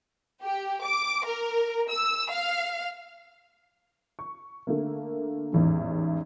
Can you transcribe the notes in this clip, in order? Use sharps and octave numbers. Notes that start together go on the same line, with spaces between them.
G4
D6
A#4
E6
F5
C#6
D3 A3 A#3
A1 E2 G#2